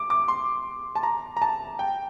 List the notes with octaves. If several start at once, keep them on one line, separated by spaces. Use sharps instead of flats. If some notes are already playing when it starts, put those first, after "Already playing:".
Already playing: D6
D6
C6
A5
A#5
A#5
A5
G5